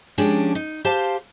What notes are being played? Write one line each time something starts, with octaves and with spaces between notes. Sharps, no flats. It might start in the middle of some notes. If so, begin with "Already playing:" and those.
F3 G#3 C#4 D4 G4
D#4
G4 C5 F5 A5